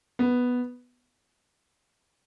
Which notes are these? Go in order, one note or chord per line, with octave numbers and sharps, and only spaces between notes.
B3